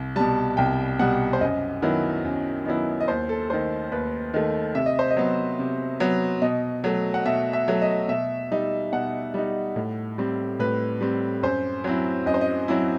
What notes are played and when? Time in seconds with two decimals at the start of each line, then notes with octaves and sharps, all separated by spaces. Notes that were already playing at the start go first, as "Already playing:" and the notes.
Already playing: C2
0.16 B2 G3 A5
0.57 C2 G5
0.99 B2 G3 F#5
1.33 C5
1.41 F#2 D#5
1.82 D#3 F#3 B3 E4
2.25 F#2
2.66 D#3 F#3 B3 E4
3.00 D#5
3.08 D#2 C5
3.29 A4
3.50 D#3 A3 C5
3.92 D#2 B4
4.34 D#3 A3
4.75 C3 E5
4.86 D#5
4.99 C5
5.11 D#5
5.17 F#3 B3
5.59 C3
6.00 F#3 B3
6.42 B2 D#5
6.84 F#3 A3
7.14 F#5
7.26 B2 E5
7.53 E5
7.68 F#3 A3
7.82 D#5
8.08 B2 E5
8.51 G3 D#4
8.92 B2 F#5
9.34 G3 D#4
9.76 A2
10.18 G3 C4
10.59 A2 B4
11.01 G3 C4
11.43 F#2 C5
11.84 F#3 C4 E4
12.26 F#2 D#5
12.34 C5
12.41 D#5
12.68 F#3 C4 E4